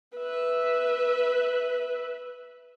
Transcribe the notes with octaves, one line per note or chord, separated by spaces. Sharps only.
B4 E5